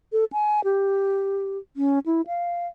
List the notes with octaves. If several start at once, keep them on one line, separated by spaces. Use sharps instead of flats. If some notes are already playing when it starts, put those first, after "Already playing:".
A4
G#5
G4
C#4
E4
F5